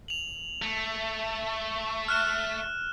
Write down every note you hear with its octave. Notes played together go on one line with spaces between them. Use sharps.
F7 F#7
A3
F6 F#6 E7